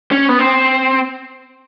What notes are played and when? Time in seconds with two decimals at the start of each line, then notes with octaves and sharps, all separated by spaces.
0.11 C#4
0.29 B3
0.39 C4